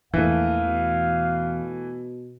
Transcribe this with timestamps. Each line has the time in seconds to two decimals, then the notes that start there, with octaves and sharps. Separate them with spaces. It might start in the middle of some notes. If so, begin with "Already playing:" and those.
0.14 A#1 E2 E3 A3 F5
0.67 B2